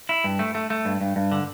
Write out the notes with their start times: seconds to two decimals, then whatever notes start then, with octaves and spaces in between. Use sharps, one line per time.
0.09 E4
0.24 G2
0.39 A3
0.55 A3
0.70 A3
0.85 G2
1.01 G2
1.16 G2
1.32 D3